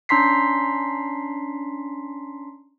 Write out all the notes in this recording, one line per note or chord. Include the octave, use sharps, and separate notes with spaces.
C#4 D4 A#5 C6 B6 C7